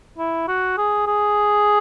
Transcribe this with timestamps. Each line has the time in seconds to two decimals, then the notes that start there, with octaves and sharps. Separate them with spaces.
0.18 E4
0.48 F#4
0.77 G#4
1.07 G#4